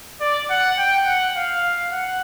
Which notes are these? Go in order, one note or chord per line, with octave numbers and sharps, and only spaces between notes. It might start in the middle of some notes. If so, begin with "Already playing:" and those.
D5
F#5
G5
F#5
F5
F#5